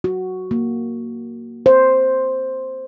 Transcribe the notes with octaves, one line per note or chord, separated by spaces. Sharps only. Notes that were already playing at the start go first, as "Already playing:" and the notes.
F#4
A#3
C5